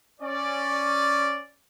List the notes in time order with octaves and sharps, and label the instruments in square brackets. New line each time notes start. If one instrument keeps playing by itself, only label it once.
[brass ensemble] C#4 D5